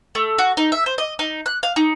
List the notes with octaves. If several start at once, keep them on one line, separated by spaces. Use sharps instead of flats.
A3
F#4
D#4
E5
C5
D#5
D#4
F#6
F5
D#4